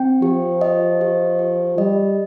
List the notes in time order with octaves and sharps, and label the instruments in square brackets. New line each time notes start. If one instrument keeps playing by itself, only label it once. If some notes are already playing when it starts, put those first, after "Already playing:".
Already playing: [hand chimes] C4 G5
[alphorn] F3 [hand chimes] G4
[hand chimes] D#5
G4
G4
[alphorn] G3 [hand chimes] D#5